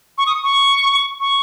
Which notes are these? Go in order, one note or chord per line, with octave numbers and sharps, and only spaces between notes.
C#6
D#6
C#6
C#6